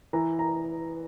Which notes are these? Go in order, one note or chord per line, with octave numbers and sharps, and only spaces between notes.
E3 A#5
A#5